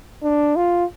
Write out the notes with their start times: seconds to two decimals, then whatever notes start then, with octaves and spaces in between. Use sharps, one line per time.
0.23 D4
0.56 F4